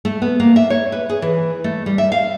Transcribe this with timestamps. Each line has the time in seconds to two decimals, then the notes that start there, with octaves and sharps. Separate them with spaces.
0.05 A3
0.22 B3
0.40 A#3
0.56 E5
0.70 C#5
0.92 B4
1.09 G#4
1.22 E3
1.64 A3
1.86 G3
1.98 E5
2.12 F5